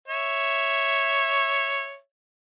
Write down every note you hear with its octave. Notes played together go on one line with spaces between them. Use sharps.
C#5 E5